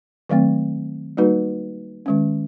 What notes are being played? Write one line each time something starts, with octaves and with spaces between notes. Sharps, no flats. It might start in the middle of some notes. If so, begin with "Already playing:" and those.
D#3 F#3 A3 C4
G3 A#3 D#4 F#4 B4
D#3 G#3 C#4